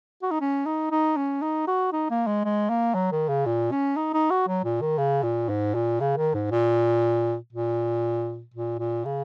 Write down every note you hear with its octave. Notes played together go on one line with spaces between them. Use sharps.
F#4
D#4
C#4
D#4
D#4
C#4
D#4
F#4
D#4
A#3
G#3
G#3
A#3
F#3
D#3
C#3
A#2
C#4
D#4
D#4
F#4
F#3
A#2
D#3
C#3
A#2
G#2
A#2
C#3
D#3
G#2
A#2
A#2
A#2
A#2
C#3